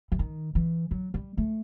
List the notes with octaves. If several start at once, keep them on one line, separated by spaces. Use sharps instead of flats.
E3
D#3
E3
F#3
G3
A3